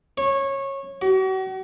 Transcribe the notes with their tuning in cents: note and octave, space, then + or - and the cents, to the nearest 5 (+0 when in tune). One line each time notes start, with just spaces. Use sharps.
C#5 -20
F#4 +40